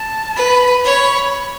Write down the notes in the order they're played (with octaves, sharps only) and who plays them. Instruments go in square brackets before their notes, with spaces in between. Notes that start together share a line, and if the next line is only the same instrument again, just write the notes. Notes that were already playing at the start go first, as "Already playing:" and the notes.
Already playing: [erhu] A5
[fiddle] B4 [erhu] B5
[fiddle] C#5 [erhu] B5